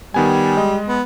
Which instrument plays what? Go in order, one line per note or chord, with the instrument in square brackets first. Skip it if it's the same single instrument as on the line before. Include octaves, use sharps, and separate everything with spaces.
[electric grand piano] D#3 B3 G#5 [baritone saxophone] G3
[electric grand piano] G#3 D#5
[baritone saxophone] B3